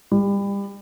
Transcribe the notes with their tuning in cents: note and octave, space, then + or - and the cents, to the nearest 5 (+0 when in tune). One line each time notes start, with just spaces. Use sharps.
G3 +30